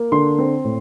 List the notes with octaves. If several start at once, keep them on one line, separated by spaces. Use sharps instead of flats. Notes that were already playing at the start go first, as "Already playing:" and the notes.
Already playing: A#3
D3 C6
C4
A2